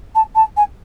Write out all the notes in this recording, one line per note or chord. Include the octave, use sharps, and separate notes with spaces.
A5
A5
G#5